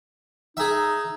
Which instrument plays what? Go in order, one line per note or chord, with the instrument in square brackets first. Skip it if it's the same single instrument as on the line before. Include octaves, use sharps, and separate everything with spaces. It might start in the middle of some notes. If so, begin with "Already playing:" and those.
[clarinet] D#4 [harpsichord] G#4 E5